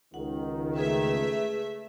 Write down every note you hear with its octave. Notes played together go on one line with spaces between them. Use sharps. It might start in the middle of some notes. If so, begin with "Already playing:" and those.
C#2 D#3 F#5
A3 G#4 B4 E5